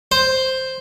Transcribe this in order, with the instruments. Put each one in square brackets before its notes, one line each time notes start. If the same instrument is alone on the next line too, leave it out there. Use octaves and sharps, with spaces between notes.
[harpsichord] C5